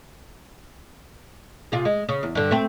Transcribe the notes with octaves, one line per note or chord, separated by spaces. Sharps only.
C3 F4 G#4
G#3
C#3
E2
G2 D3
A3 C4